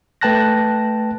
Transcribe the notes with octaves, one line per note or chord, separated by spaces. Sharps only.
A3 B4 G5 A5 F#6 A#6